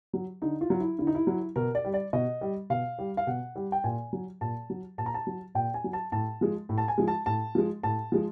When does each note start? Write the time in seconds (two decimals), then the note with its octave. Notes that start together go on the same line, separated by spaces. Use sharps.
0.13 F#3
0.42 D3 D#4
0.61 F4
0.70 F#3
0.80 E4
0.99 D3 E4
1.07 D#4
1.15 E4
1.27 F#3
1.56 B2 A#4
1.75 D5
1.85 G3
1.94 D5
2.13 B2 D#5
2.41 G3
2.70 B2 F5
2.99 G3
3.17 F5
3.27 B2 F#5
3.56 G3
3.72 G5
3.84 A#2 G#5
4.13 F#3
4.41 A#2 A5
4.70 F#3
4.98 A#2 A5
5.06 A#5
5.14 A5
5.27 F#3
5.55 A#2 G5
5.74 G#5
5.84 F#3
5.93 A5
6.12 A2 A5
6.41 F3 G#3
6.69 A2
6.78 A5
6.88 G#5
6.98 F3 G#3
7.08 A5
7.26 A2 A5
7.55 F3 G#3
7.83 A2 A5
8.12 F3 G#3